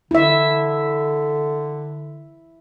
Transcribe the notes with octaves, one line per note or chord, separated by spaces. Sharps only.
D3 E4 E5